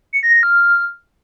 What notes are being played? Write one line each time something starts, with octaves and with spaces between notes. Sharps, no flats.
C#7
A#6
A#6
F6